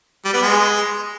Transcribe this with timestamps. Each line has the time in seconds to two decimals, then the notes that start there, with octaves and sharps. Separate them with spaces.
0.25 G3
0.34 B3
0.42 G#3